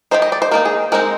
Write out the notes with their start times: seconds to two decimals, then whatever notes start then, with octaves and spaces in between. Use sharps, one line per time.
0.11 D#3 A#3 D#4 C5
0.22 D#5
0.32 D5
0.42 C5
0.51 D#3 A#3 D#4 A#4
0.65 G#4
0.92 G#3 C4 D#4 A#4